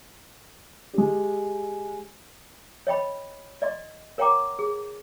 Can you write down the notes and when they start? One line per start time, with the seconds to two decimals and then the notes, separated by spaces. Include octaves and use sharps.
0.94 G#3 G4
2.87 C#5 D#5 G5 B5
3.62 D5 D#5 C6
4.18 A#4 C#5 F#5 G5 A#5 D6
4.59 G#4